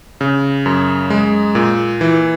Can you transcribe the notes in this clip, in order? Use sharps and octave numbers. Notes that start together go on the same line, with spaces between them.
C#3
F#2
G#3
A#2
E3